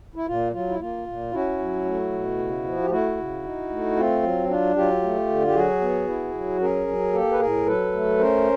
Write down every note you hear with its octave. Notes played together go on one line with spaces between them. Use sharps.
E4
A#2 F4
F#3 F4
E4
A#3 F4
A#2
C#4 E4 F#4
F#3
A3
B2
C#3
F3
G4
A3 E4 F#4
C#3
D#4
A3
C4 F4
F#3
D4 F4
F#3 F4 G4
A3
D3
G4
F#3 F#4 G#4
B3
E4
F#3
C#4 G#4 A#4
F#3
A#3 G4 A4
B4
A2 G#4 A#4
F#3 A4 B4
A3
C#4 A#4 C5